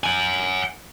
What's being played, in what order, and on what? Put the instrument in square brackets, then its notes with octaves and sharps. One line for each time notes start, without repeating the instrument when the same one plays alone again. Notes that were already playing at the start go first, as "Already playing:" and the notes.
[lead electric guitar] F#5 G#5